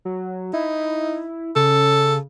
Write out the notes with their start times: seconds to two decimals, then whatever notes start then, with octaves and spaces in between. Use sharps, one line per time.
0.05 F#3
0.53 D#4 E4
1.56 C#3 A4